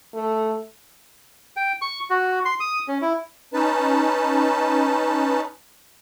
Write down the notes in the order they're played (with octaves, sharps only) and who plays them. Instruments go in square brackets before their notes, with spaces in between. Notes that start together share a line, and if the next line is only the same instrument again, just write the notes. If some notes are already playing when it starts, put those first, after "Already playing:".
[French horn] A3
[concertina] G5
C#6
F#4
C6
D#6
C#4
E4
[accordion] C#4 D#4 B4 A5